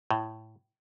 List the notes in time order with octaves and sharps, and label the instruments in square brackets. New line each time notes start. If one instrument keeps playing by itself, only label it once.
[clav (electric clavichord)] A2